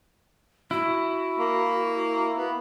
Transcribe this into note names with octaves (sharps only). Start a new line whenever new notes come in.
E4 F#4
A#3
B3